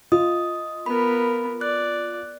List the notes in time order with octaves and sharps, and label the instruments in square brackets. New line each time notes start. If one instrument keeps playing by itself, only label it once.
[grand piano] F4 [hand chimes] D#5 D#6
[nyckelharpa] B3 A#4 [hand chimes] B5
[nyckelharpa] D5 [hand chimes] F#6